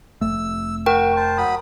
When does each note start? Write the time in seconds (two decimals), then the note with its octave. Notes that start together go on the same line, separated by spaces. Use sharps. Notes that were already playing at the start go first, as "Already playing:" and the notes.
0.21 F1 F2 A3 E6
0.86 F#4 A#4 G5
1.17 C5 A5
1.38 F#3 B5 D#6